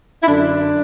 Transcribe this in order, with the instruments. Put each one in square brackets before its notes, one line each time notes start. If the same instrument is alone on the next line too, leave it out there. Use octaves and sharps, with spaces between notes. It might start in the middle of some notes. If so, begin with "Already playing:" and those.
[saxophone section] E4
F#2 D3 D4